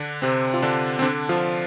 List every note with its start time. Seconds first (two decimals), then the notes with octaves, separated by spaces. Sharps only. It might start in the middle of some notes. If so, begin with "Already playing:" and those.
Already playing: D3 D4
0.22 C3 C4
0.54 F4
0.62 D3 D4
0.99 C4
1.02 D3 D4
1.29 F3 F4